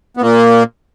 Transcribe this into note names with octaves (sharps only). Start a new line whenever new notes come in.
B3
A#2 A#3